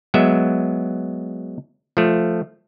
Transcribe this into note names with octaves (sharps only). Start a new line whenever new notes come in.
F#3 G#3 B3 E5
F3 A3